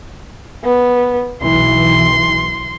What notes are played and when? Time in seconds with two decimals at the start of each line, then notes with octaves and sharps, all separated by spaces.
0.64 B3
1.43 B1 E3 C6